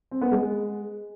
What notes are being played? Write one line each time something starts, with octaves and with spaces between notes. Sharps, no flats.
C4
B3
G#3